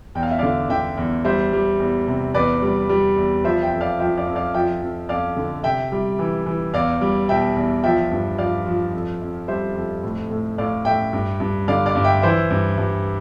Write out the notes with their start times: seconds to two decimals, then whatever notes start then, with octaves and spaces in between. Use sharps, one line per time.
0.15 E2 G5
0.23 F5
0.31 E5
0.38 D3 D5 F5
0.70 D3 E5 G5
0.97 E2
1.25 G3 C5 E5
1.53 G3
1.80 E2
2.08 C3
2.34 E2 B4 D5
2.62 G3
2.89 G3
3.17 E2
3.44 F3 C5 E5
3.63 E5 G5
3.72 F2
3.81 D5 F5
3.99 F3 E5 G5
4.17 D5 F5
4.27 F2
4.35 D5 F5
4.54 F3 E5 G5
4.82 F2
5.09 F2 D5 F5
5.36 D3
5.63 C3 E5 G5
5.92 G3
6.19 E3
6.46 E3
6.73 E2 D5 F5
7.01 G3
7.29 B2 E5 G5
7.56 E2
7.84 F3 E5 G5
8.11 G2
8.38 F3 D5 F5
8.66 F3
8.93 F2
9.21 F2
9.48 G3 C5 E5
9.76 F2
10.03 A2
10.30 A2
10.58 A2 D5 F5
10.85 A2 E5 G5
11.13 G2
11.40 G2
11.68 D3 D5 F5
11.86 D5 F5
11.95 G2
12.04 E5 G5
12.22 E3 C5 E5
12.50 G2
12.78 G2